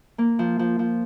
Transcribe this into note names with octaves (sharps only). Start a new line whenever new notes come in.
A#3
F3
F3
F3